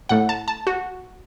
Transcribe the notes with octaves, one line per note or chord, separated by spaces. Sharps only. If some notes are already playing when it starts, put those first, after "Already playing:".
A2 A3 F#5
A5
A5
F#4